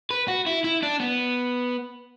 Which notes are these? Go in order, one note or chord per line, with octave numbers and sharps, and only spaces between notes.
B4
F#4
E4
E4
D4
B3